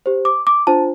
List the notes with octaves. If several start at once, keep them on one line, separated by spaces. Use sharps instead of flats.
G4 C5
D6
D6
D4 F4 C5 A5